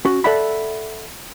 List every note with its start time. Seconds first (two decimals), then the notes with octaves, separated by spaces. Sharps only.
0.05 C#4 F#4
0.24 A4 D5 E5 F#5 B5